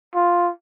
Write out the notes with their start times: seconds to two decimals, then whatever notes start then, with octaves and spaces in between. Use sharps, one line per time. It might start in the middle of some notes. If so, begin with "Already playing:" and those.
0.15 F4